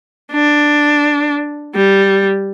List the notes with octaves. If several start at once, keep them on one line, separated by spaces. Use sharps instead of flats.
D4
G3